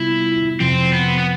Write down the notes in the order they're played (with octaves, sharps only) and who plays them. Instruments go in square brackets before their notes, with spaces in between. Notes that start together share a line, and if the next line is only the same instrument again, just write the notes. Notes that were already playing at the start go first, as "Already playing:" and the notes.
Already playing: [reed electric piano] C3 G3 B3 F4 [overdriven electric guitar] E4
[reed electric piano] F2 C3 F3 [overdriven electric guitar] C4
[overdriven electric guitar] B3
B3